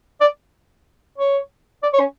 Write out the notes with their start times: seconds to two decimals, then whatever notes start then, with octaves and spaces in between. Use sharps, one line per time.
0.21 D5
1.18 C#5
1.83 D5
1.93 C#5
2.00 C#4